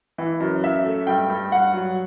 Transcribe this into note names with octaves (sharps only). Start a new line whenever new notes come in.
E3
F#2
F#2 E5
A3
G2 G5
G2
G2 F#5
F#3